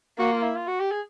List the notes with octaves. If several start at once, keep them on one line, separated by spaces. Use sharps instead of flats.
A#3 F#4
F4
E4
F4
F#4
G4
G#4